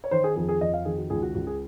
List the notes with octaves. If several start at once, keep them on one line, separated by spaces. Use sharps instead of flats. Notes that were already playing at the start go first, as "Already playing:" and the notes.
C#5
D#3 C5
G#4
F2 G#4
G#4
F2 D#5
F5
D#3 G#4
F#4
C#2 G#4
F#4
C#2 F#4
G#4